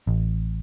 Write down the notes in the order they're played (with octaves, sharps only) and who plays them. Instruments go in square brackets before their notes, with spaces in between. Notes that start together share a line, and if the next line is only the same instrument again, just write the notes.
[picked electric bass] A1